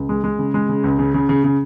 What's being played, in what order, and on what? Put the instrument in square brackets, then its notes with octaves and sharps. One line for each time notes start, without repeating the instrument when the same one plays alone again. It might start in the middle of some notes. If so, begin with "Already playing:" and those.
Already playing: [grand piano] C#2
G#3
G#3
C#3
G#3
C#3
C#2
C#3
C#3
C#3
C#3